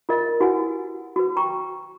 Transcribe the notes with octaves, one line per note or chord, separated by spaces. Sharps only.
F4 A#4 D#5
E4 F#4 G4 B4 F#5 G#5
F#4 B4
G5 A#5 C#6